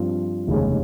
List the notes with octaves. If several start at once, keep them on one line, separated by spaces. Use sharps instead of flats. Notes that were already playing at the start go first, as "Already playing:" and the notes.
Already playing: G2 F3 C4 F4
F1 D#2 C#3 G#3 C#4